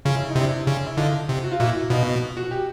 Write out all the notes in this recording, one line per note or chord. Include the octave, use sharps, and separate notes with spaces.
C#3 F4
E4
D#4
C3
D4 E4
C#3
E4
D3 D#4 F4
C3
F#4
F4
A#2 E4 F#4
B2 D#4 F4
F#4
G4